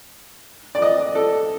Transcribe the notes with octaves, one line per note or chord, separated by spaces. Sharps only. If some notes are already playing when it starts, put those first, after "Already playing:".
D5
D#5
A4